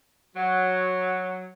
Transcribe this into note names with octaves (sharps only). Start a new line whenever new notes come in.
F#3